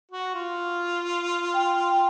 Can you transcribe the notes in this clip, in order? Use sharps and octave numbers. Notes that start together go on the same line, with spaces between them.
F#4
F4
G5